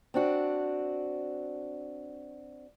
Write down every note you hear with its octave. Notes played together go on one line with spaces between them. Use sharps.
C4 D4 F#4